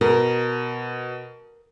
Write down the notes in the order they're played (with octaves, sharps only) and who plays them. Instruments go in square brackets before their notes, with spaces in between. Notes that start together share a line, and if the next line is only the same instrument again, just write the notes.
[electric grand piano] B2 [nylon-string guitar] A#4